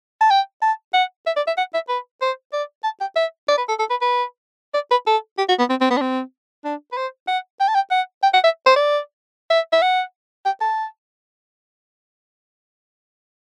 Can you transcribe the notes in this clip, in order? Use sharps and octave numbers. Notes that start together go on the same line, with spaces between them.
A5
G5
A5
F#5
E5
D5
E5
F#5
E5
B4
C5
D5
A5
G5
E5
D5
B4
A4
A4
B4
B4
D5
B4
A4
G4
F#4
B3
C4
C4
B3
D4
C4
D4
B4
C5
F#5
G5
A5
G5
F#5
G5
F#5
E5
C5
D5
E5
E5
F#5
G5
A5